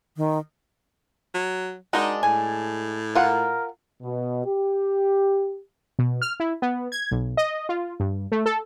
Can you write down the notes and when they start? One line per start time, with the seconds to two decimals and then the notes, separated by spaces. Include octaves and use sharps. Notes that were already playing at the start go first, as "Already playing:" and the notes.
0.17 D#3
1.34 F#3
1.93 G#3 D4 D#4 F#4 A#4 D#5
2.23 A2 G#5
3.15 F4 A#4 F#5
4.02 B2
4.45 G4
5.99 B2
6.22 F6
6.40 E4
6.62 B3
6.92 G#6
7.11 B1
7.37 D#5
7.69 F4
8.00 G2
8.32 A3
8.46 A4